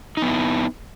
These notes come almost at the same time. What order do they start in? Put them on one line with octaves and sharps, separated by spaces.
D#4 B3 E4